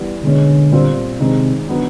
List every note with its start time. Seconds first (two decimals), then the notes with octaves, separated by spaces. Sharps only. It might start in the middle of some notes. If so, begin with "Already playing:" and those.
Already playing: E3 G3 B3
0.24 B2 D3 G#3 C#4
0.71 A#2 G3 C4 F4
1.20 C3 D#3 G#3 C4
1.68 D3 F#3 B3 D#4